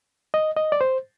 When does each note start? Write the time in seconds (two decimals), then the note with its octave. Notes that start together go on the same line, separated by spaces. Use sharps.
0.34 D#5
0.57 D#5
0.72 D5
0.81 C5